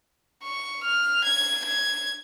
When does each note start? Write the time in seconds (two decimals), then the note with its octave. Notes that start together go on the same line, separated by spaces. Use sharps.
0.44 C#6
0.84 F6
1.24 G#6
1.65 G#6